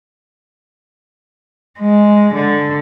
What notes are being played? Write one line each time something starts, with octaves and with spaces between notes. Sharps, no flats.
G#3
D3